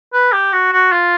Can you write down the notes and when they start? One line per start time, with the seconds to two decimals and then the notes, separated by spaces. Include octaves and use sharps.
0.13 B4
0.32 G4
0.53 F#4
0.72 F#4
0.92 F4